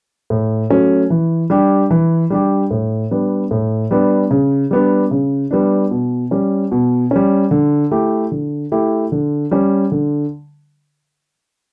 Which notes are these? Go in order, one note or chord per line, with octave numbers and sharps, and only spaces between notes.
A2
F#3 A3 C#4 F#4
E3
G3 D4 G4
E3
G3 D4 G4
A2
G3 B3 D4
A2
G3 B3 D4
C#3
G3 B3 D4
C#3
G3 B3 D4
B2
G3 C#4
B2
G3 C#4
D3
A3 E4 G4
D3
A3 E4 G4
D3
G3 C#4
D3